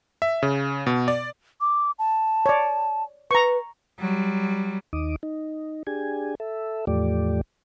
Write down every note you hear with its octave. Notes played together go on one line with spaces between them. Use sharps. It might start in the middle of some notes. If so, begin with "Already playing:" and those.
E5
C#3
B2
D5
D6
A5
C#5 D5
B4 A#5 C#6
F#3 G3
D#2 D#4 D6 D#6
D#4
D4 G4 G#4 G#5
A4 E5
E2 A2 F3 A3 G4 D5